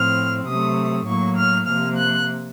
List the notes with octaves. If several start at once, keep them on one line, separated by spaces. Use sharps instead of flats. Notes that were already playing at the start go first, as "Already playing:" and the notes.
Already playing: A2 F3 C4 F6
C3 F#3 A3 D#6
A2 F#3 A#3 C#6
F6
C3 F3 A#3 F6
F#6